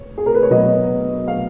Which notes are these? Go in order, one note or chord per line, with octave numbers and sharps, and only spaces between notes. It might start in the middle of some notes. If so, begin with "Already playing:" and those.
Already playing: C#5
G#4
A#4
B4
C#5
B2 F#3 D#5
F5